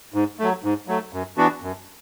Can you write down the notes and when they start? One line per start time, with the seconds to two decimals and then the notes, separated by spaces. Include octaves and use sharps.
0.14 G#2
0.39 F#3 A3
0.64 G#2
0.88 F#3 A3
1.13 F#2
1.37 E3 B3 D4 F#4
1.62 F#2